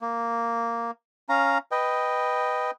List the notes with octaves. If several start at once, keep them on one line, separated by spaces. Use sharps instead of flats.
A#3
C#4 F5 A#5
B4 D#5 G5